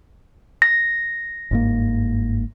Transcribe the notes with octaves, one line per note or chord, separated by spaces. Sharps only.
A#6
G1 G#2 A#3